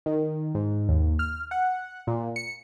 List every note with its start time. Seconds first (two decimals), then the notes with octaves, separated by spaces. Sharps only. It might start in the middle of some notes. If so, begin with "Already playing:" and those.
0.06 D#3
0.55 G#2
0.89 D#2
1.19 F6
1.51 F#5
2.07 A#2
2.36 C#7